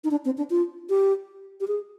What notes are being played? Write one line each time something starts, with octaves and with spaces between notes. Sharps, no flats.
D#4
D4
C4
D4
F4
G4
G4
G#4